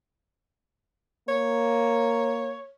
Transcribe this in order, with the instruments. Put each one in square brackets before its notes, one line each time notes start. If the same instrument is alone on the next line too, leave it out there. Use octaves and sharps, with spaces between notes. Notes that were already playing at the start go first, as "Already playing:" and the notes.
[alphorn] A#3 [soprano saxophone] C#5